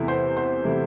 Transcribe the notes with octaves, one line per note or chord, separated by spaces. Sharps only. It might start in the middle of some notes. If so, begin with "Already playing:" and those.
Already playing: E2 C3 E3 A3 E4
C5
C5
C3 E3 A3 E4